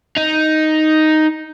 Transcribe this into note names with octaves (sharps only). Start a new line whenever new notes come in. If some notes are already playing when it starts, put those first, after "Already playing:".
D#4